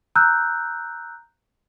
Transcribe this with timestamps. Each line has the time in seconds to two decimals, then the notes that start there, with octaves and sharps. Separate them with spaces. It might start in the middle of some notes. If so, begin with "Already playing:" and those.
0.15 A#5 E6 F#6 G6